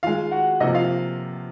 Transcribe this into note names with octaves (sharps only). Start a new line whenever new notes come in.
D#3 G#3 F4 F5
F#4 F#5
C3 F3 A#3 D#4 D#5
F4 F5